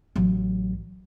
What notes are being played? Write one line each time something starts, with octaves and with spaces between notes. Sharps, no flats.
A1 F#3